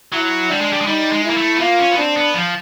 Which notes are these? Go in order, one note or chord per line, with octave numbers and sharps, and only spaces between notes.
F#3 E4
G3 D4
G#3
G3
G#3
G3 D#4
G#3
E4
A#3
A3
B3
A#3 F4
C#4
B3
C4 D4
B3
F3